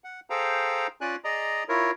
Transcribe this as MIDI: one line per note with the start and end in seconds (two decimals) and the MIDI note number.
0.04 0.20 78
0.30 0.87 68
0.30 0.87 69
0.30 0.87 72
0.30 0.87 77
0.30 0.87 79
0.30 0.87 82
1.01 1.16 61
1.01 1.16 65
1.01 1.16 74
1.01 1.16 80
1.01 1.16 90
1.24 1.64 68
1.24 1.64 74
1.24 1.64 75
1.24 1.64 82
1.69 1.91 64
1.69 1.91 65
1.69 1.91 70
1.69 1.91 73